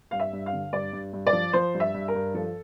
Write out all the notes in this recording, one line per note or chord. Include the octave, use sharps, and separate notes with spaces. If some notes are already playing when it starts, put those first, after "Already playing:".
G2 F5
E5
G2
F5
D3
G2 D5
G2
G2
D5
F3
F3 C5
G2
E5
G2
A#4
G2
F3 A4